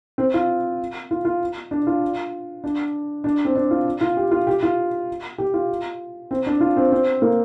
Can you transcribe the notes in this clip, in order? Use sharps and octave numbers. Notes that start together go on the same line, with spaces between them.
C4
F4
F4
F4
D4
F4
D4
D4
C4
D4
F4
F4
G4
F4
G4
F4
G4
F4
C4
D4
F4
C4
C4
A#3